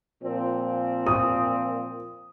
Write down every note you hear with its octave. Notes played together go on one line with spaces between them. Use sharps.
A#2 F3 C4
D#6